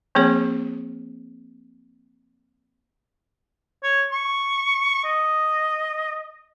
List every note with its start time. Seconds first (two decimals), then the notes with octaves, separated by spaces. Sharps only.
0.15 F3 A#3 C4 G#4 C#5
3.83 C#5
4.12 C#6
5.04 D#5